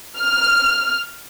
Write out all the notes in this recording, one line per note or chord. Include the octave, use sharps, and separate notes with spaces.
F6